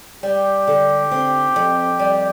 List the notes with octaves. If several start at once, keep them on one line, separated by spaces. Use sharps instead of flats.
G3 G4
D3
C4
F2
G3